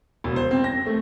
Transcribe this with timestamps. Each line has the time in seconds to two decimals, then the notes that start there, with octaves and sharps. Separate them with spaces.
0.24 E1
0.36 C5
0.51 C4
0.64 A#6
0.86 A3